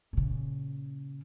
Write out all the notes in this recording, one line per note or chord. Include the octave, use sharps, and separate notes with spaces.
A#2 C#3